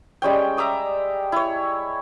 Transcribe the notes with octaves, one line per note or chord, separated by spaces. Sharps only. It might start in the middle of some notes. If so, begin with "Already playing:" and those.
G3 G#3 C#4 G5
E5 A#5 D6 D#6
E4 C#5